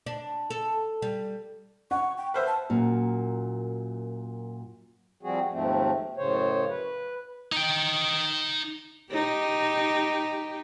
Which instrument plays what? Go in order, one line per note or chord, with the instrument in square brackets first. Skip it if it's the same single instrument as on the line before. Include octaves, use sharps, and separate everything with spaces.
[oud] D4
A4
G3
[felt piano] F#5 [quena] C#6
[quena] G5
[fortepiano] B4 C5 E5 [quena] F6
[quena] A5
[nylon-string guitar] F#2 A#2
[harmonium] F3 G3 C4 F#4 G#4
D#2 G#2 F3 A3 C4
F#2 A2 C#3 C5 C#5
B4
[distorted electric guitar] D#4 G5
[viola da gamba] D#4 G4